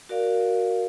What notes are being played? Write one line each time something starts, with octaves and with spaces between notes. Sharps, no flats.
F#4 A#4 D5 F5